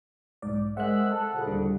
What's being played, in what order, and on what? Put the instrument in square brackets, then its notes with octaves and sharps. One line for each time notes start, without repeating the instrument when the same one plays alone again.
[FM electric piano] B1 G#2 D5
[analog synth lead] G#3 [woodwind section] C4 A#4 E5 [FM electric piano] F#5 F#6
[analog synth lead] A4
[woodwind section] C2 A#2 C#3
[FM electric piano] D#2 D3 [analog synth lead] G3